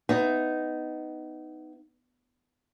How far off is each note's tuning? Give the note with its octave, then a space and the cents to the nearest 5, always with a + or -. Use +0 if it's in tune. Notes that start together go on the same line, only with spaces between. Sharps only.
B3 +20 D#4 +0 E5 +20